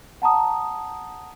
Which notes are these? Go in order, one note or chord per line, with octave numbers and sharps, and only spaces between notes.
F#5 A5 A#5 D#6